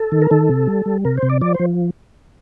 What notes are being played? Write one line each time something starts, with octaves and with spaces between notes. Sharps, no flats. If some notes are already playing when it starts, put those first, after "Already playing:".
Already playing: A4
D#3
A#4
D#3 A4
C3
G3
G3
C3 A#4
C5
C3
D5
F3 D5
F3 C5